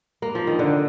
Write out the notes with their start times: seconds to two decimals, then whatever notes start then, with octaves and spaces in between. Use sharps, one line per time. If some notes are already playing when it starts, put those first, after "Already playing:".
0.22 A#3
0.35 F3
0.47 D#3
0.59 D3